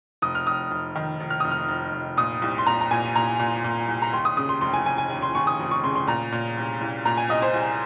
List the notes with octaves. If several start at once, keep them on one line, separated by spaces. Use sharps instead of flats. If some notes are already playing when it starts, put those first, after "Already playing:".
F1 D#6
F6
F1 D#6
F1
D#3
F1
F6
F1 D#6
F6
F1
F1
A#2 D#6
C2
C6
A#2 A#5
A#5
A#2 G#5
A#2 A#5
A#2
A#2
C2
A#5
D#2 C6
D#6
C#3 D#6
C6
F1 C6
G#5
F1 G#5
G#5
D#2
C6
D#2 C#6
D#6
F1
C#6
C#3 C6
C6
A#2 A#5
A#2
C2
C2
A#2 A#5
G#5
C2 D#5
C5
C2